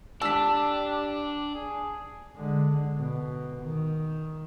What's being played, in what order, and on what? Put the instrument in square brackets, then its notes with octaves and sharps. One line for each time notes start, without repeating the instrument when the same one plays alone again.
[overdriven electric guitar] D4 [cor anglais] G4 [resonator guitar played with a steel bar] A5 [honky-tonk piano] E6 B6
[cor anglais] G#4
[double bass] D3 G#3
B2
D#3